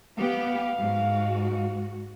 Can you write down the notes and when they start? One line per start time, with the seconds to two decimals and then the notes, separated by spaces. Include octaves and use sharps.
0.17 B3 G4 F5
0.77 G#2 F#4